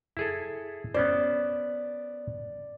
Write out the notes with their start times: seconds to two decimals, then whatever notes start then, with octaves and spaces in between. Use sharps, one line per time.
0.17 E4 G#4 A4
0.94 B3 C#4 C5 D5